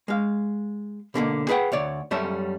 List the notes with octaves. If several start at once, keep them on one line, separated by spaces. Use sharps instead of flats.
G#3 F5
B2 D3 F#3 A#3
G#4 B4 F#5 G5
D2 C#5 D5
F#2 G3 A3 C#4 A4 E5